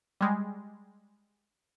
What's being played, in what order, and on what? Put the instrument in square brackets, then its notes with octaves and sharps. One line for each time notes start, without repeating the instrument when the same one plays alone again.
[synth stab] G3 G#3